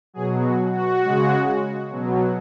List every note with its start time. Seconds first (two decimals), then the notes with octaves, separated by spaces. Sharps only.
0.14 B2 F#3 G#4
0.44 F#4
0.72 F#4
1.02 C#3 G#3
1.90 B2 F#3